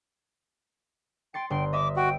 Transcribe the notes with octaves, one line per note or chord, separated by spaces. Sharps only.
G5 C6 A6 C#7
G1 G5 C6
D#5 E5 D6
F#4 G5